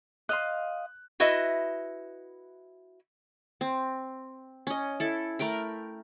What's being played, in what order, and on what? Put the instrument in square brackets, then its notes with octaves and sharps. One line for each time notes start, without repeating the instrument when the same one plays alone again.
[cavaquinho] D#5 F5 C6 [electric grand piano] F#6
[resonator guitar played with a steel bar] E4 F#4 B4 D#5 E5
[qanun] C4
C#4 D#5
E4 A4
A3 A#4 G5 B5